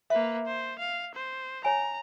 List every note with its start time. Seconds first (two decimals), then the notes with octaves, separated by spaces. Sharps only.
0.10 A#3 B4 E5
0.46 C5
0.79 F5
1.15 C5
1.65 C#5 G#5 A#5